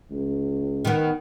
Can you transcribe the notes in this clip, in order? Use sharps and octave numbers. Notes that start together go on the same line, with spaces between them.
C#2
D#3 B3